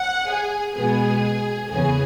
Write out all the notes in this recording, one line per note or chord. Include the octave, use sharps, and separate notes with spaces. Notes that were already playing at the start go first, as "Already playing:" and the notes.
Already playing: F#5
G#4
B2 G#3 B3 G#4
E2 C#3 E3 B3 G#4